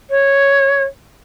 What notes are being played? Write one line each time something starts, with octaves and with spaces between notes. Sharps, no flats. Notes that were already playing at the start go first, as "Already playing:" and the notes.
C#5